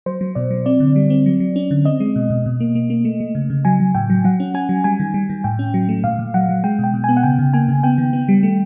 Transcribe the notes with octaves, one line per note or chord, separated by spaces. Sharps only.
F#3 C5
F#3
B2 D5
F#3
C4 D5
D3
G3
C4
F#3
F#3
C#4
D3
C4 D#5
G#3
B2
B2
B2
A#3
A#3
A#3
A3
A3
C#3
C#3
F#3 G#5
F#3
A2 G5
F#3
F#3 F#5
C#4
C#4 G#5
F#3
G3 G#5
D#3
G3
D#3
A2 G5
C#4
F#3
A3
A#2 F5
A#2
F#3 F#5
F#3
G#3 G5
B2 G5
B2
B3 G#5
F#5
C#3 G5
C#3
A#3 G#5
C#3
B3 G5
D#3
B3
G3
A3